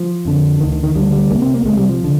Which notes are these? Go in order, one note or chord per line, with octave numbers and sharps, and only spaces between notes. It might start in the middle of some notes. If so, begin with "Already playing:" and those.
Already playing: F3
F2 D3
D2 D3 D#3
D#3
D#3
D2 D3 G3
G3
C2 C3 A#3
C4
A#3
C2 C3 G#3
G3
F3
D3